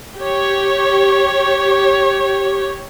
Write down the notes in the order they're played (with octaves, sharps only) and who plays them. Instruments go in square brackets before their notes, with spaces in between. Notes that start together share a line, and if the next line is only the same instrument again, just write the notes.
[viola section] G4 C#5